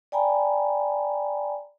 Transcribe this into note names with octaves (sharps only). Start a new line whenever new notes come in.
D5 G5 G#5 A#5 B5